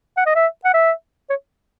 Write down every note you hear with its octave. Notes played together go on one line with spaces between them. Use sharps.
F#5
D#5
E5
F#5
E5
C#5